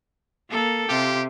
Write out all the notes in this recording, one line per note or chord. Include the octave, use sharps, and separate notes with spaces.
A#3 A4
C3 F4 G4